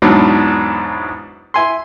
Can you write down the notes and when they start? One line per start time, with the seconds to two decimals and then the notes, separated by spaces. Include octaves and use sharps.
0.02 E2 G#2 B2 F#3 D4
1.54 E4 G#5 C6